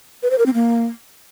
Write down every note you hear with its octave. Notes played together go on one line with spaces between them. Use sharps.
B4
C5
A#4
C4
A#3